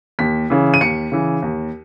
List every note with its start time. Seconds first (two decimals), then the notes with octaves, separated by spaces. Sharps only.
0.19 D#2 B6
0.50 C#3 E3
0.74 D#7
0.81 D#2 C#7
1.12 C#3 E3
1.42 D#2